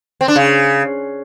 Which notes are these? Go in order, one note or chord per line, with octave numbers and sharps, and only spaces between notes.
C4
D4
C#3